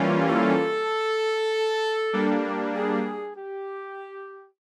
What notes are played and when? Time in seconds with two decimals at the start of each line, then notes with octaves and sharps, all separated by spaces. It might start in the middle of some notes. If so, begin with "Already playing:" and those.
Already playing: E3 G3 A#3 C#4 F4
0.28 A4
2.13 G3 A#3 D4
2.74 G#4
3.37 G4